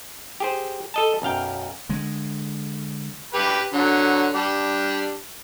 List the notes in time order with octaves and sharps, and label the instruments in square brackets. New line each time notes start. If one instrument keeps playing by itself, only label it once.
[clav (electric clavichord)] G4 G#4 C5
A4 D#5 A5
B1 F#2 F5 G5
[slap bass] D3 G#3
[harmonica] G4 B4 D6
D3 F#3
G3 D4